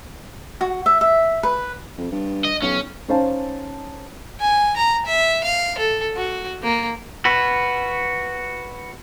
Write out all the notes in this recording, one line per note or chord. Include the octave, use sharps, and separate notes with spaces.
F#4
E5
E5
B4
F2
G2
D#5
B1 C#4
C#4 D#4 C5 F5 A5
G#5
A#5
E5
F5
A4
F#4
A#3
F#4 B4